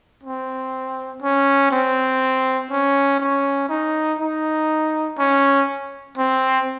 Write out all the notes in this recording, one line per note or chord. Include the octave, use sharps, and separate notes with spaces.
C4
C#4
C4
C#4
C#4
D#4
D#4
C#4
C4